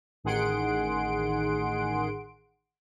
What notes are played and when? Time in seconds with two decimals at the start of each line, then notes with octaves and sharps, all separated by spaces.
0.24 A1 D#3 G#4 F#5 C6 D7